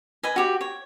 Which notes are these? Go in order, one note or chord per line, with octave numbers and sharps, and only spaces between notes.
B4 D#5 G#5
F#4 G4
C#5